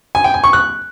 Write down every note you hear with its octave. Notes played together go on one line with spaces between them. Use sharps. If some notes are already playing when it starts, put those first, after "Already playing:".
G#5
G5
G#5
C#6
F#6